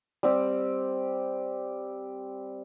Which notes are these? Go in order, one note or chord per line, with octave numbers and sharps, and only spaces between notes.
G3 C4 G4